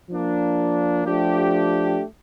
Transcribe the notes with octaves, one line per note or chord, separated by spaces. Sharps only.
F3 A#3 D4
F3 A3 D4 G4